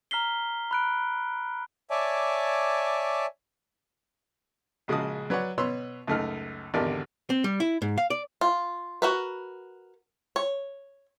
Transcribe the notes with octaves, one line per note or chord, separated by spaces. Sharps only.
A#5 F6 B6 C7 G7
B5 F#6 D7
C#5 D5 E5 G#5 A5 D6
A#1 C#3 G#3 F#4 A5 D#6
F#3 B4 C#5 D5 F#5
B2 B4 C#5 C6 C#6 E6
C#2 F#2 A3 D#4 F6
G#1 E2 D3 G4 A#4 D5
C4
G3
E4
G#2
F5
D5
F4
F#4 A#4 B4
C#5